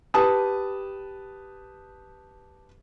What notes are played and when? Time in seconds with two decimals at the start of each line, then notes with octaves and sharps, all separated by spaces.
0.14 G4 B4 A5 D#6